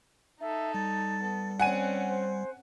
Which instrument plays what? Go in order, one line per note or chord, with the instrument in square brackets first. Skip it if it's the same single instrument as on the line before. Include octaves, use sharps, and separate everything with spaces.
[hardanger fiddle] D#4 A4 [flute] E5
[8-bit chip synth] G3 [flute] A6
[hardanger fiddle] B3 A4
[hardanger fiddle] C4 C#4 [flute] D5 [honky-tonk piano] F#5 G#5 D#7
[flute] C5